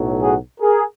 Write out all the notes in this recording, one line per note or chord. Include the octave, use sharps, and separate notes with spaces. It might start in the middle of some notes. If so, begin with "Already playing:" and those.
Already playing: B1 A2 F#3
F#4 G#4
G#4 A#4